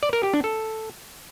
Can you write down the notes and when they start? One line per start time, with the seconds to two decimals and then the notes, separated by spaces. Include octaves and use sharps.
0.03 D5
0.13 A#4
0.23 G4
0.34 D4
0.44 A4